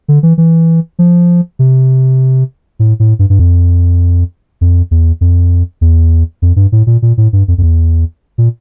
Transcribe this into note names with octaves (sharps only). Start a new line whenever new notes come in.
D3
E3
E3
F3
C3
A2
A2
G2
G2
F2
F2
E2
F2
E2
F2
G2
A2
A#2
A#2
A2
G2
F2
F2
E2
A#2